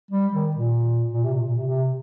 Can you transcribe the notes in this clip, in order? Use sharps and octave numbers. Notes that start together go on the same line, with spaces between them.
G3
D#3
A#2
A#2
C3
A#2
A#2
C3
C3